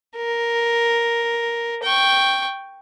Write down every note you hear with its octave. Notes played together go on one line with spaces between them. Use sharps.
A#4
G5 C#6